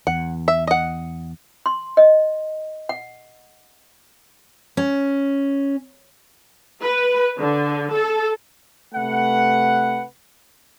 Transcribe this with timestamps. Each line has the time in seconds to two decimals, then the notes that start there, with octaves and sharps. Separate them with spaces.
0.07 E2 F#5
0.48 E5
0.67 D#5 F#5
1.66 C6
1.97 D#5
2.89 F#5
4.77 C#4
6.83 B4
7.38 D3
7.93 A4
8.94 C3 A3 B4 F#5